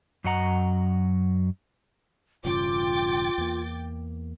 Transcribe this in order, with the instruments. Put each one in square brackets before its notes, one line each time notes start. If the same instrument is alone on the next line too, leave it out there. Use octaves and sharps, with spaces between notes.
[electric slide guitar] F#2 F#3 D#5 F#5 A#5
[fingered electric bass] E1 G2 C#3 [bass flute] F4 [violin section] G5 D6 A6
[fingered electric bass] E2 A#3